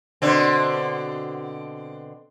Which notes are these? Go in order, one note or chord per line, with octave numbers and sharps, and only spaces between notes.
B2 D3 C4